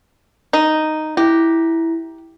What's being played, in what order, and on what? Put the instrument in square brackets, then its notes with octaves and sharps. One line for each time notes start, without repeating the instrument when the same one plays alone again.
[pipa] D#4
[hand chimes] E4 [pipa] G4